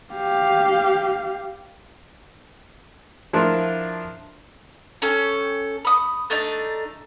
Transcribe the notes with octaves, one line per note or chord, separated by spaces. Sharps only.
G4 F5
F3 D4 E4 F4 A#4
C#4 A4 G5
B5 D#6
A3 D4 D#4 A5